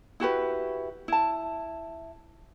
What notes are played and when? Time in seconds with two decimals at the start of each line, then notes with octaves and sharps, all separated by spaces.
0.20 E4 F#4 G4 B4
1.08 E4 A5